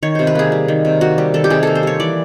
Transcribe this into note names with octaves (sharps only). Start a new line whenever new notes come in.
D#3 C#5
C3 C5
B4
A#3 G#4
G3
D#3
C3
A#3 F#4
G3
D#3 A4
G4
C3 G#4
A#3 A4
C5
G3 C#5
E3 D5